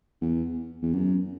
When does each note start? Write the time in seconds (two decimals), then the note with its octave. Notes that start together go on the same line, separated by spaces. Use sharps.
0.21 E2
0.83 E2
0.93 F#2